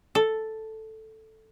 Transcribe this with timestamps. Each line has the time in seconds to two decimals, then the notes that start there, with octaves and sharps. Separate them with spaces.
0.15 A4